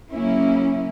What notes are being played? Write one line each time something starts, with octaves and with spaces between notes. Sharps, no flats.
C#3 F#3 A#3 C#4 E4